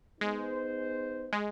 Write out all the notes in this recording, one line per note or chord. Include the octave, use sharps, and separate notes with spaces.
G#3 B3 D#4 G#4 C5
G#3